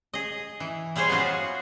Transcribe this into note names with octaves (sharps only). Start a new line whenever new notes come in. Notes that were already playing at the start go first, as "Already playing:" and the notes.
G#4 D#5
E3
G3 G#3 G#4 C5 C#5 G#5
B3 F4 F#4 G#4 B4